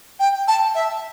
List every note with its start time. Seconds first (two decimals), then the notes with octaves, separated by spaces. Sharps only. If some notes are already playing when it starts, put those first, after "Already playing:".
0.19 G5
0.48 A5
0.75 E5